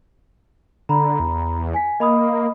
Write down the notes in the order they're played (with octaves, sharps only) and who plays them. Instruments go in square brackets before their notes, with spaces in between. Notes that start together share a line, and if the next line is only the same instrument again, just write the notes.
[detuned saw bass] D3 [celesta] A#5 B5
[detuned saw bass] E2
[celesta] G#5 B6
[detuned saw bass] A#3 [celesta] D#5 B5 D#6